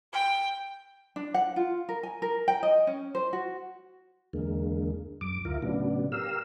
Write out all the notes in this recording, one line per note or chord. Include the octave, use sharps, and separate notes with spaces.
G5
D4
F#5
F4
A#4
G#5
A#4
G5
D#5
C#4
C5
F#4
E2 D3 G#3 A#3
F#2 D6
D2 E4 F4 A#4
A2 C#3 F#3 B3 D4
G4 A#4 F5 E6